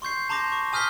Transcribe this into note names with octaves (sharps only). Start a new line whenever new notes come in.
C6 C#6 G6 C7
A5 A#5 C6 D6 G6 A#6
C#6
G#5 D#6 F6 G6 B6 G7